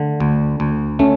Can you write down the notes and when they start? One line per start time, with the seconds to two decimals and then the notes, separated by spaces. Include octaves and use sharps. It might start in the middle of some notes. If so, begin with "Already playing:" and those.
Already playing: D3 A3
0.20 D2
0.60 D2
0.99 A3 C#4